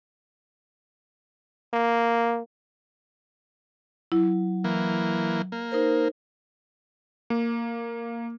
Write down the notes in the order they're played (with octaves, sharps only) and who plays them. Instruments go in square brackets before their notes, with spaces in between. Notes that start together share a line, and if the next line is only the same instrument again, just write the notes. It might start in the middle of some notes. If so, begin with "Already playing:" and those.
[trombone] A#3
[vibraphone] F#3 [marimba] E4
[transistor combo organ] E3 A#3
A#3
[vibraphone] D#4 A#4 C5
[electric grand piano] A#3